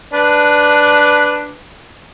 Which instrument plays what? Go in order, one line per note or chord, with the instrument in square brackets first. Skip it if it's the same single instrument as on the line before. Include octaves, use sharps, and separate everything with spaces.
[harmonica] D4 B4